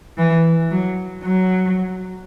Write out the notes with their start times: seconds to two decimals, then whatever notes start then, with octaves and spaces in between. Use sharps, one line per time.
0.18 E3
0.71 F#3
1.23 F#3